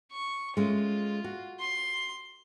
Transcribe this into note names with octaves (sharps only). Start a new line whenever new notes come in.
C#6
G#3 A3 C#4 F4
F#4
C6